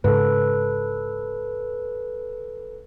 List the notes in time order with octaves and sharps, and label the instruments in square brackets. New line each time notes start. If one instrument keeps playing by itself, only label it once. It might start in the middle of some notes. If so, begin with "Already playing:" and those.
[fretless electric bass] G#2 C#3 [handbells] A4 B4